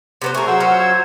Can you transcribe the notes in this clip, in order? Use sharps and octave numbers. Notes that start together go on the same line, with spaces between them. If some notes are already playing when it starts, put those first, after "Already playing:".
C3 B3 C5
A3 G#4 A#4 C#6
F#3 C5 F#5 E6
C#4 F4 F#4
G#6